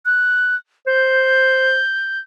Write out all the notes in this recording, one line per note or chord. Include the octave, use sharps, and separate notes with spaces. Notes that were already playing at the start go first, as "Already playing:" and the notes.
F#6
C5 G6